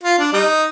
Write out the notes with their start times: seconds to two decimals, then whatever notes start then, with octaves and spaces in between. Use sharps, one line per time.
0.03 F4
0.19 D4
0.33 G3 D#4